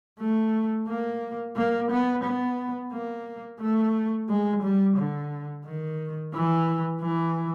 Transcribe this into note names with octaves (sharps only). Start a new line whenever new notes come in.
A3
A#3
A#3
B3
B3
A#3
A3
G#3
G3
D3
D#3
E3
E3